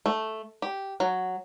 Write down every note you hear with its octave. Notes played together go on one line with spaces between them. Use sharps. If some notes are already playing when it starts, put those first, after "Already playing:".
A3
G4
F#3